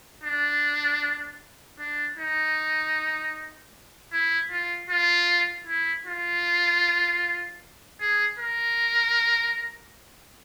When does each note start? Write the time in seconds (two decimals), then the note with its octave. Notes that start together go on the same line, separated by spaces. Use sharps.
0.24 D4
1.79 D4
2.18 D#4
4.12 E4
4.51 F4
4.90 F4
5.67 E4
6.07 F4
8.00 G#4
8.39 A#4